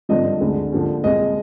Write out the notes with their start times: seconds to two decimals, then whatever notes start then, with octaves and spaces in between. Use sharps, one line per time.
0.09 G#1 G2 D3 F3 D#5
0.41 D2 D3 G#3
0.72 D#2 D3 F3
1.03 C2 A#2 G#3 D#5